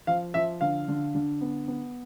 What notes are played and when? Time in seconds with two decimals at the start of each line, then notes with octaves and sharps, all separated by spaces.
0.07 F3 F5
0.34 F3 E5
0.61 D3 F5
0.88 D3
1.15 D3
1.41 B3
1.68 B3